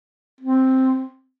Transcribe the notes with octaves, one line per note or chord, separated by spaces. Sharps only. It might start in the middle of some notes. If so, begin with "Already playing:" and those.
C4